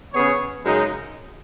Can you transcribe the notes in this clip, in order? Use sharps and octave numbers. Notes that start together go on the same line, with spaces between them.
C#3 B3 G#4 C#5
F#2 C#3 G#3 D#4